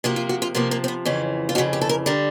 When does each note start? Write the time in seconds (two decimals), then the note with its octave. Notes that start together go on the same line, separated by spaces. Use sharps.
0.04 C3 F3 A#3 F#4
0.16 F4
0.29 F#4
0.42 F4
0.55 C3 F3 A#3 B3
0.71 A#3
0.84 C4
0.88 B3
1.05 F2 C#3 E3 C#4
1.49 F4
1.55 F2 F#4
1.58 C#3 E3
1.73 G4
1.81 A4
1.89 A#4
2.06 D3 G3 A#4